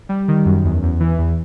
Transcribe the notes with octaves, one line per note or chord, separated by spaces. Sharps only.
G3
D#3
F#2
E2
E2
E3
E2